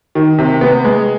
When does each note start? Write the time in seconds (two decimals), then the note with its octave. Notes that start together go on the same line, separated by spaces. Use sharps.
0.15 D#3
0.38 C3
0.61 B3
0.85 G#3